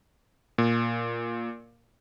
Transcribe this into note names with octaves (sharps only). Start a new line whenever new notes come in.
A#2